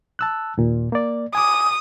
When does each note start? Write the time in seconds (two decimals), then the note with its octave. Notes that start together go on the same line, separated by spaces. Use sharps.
0.19 A5 E6 F#6
0.58 D#2 A#2
0.92 A#3 D5
1.35 G#5 D6 D#6